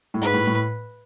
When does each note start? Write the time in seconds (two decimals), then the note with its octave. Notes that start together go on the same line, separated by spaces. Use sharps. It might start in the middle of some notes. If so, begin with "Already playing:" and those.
0.14 A2
0.22 G#2 B4
0.34 A2
0.47 A2